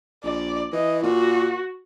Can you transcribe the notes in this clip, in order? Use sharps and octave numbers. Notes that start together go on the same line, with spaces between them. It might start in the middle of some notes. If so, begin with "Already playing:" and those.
A#1 D5
E3 D#5
A#2 F#4